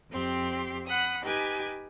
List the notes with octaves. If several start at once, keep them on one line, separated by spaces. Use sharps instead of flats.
F2 C4 G4 C6
F#5 B5 D#6
D#4 G4 B4 G5 G#5